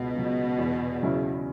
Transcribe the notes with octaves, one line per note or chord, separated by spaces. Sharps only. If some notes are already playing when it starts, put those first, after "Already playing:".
Already playing: C#2 B2
C#3 F#3
E2
C#3 F#3 C#4 E4